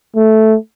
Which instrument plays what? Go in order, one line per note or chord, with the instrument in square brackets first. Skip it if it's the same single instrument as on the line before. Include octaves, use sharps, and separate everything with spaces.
[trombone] A3